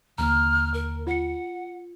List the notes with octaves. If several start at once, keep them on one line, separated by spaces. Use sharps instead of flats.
D#2 D3 A#3 A#5 F6
A#4
F4 F#5 C#7